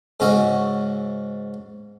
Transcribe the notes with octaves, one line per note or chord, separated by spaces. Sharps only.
G#2 C#3 C#4 F#4 D#5 E5